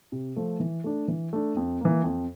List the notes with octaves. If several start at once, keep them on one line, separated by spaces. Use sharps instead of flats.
C3
F3 A3
E3
A3 D4
E3
A3 D4
F2
E3 A#3
F2